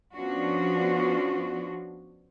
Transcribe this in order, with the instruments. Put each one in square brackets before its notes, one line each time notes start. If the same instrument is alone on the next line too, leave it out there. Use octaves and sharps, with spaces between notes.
[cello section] F3 B3 C#4 D4 F4 F#4